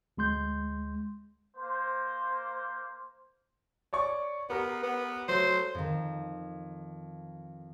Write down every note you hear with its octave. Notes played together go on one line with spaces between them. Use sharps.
D2 G#3 C6 G6
A#3 C5
C#5 D5 C#6
B3 G4 A#4 A#5
B3
F#3 A3 C5
F2 D#3